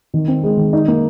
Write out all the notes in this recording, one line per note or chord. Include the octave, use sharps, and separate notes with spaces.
D#3
C4
G#3
D#3
D#4
A#3